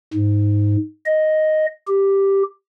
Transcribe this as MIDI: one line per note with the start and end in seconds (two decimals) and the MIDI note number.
0.14 0.77 44
1.06 1.66 75
1.87 2.43 67